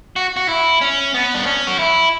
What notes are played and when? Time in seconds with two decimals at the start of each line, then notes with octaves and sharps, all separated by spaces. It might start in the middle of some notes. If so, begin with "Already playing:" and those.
0.16 F#4
0.37 F#4
0.49 E4
0.81 C#4
1.14 B3
1.34 D4
1.46 C#4
1.67 F#4
1.79 E4